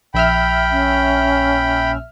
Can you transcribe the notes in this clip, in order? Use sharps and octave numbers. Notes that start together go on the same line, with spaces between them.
A#1 E5 G5 B5 F6
C#4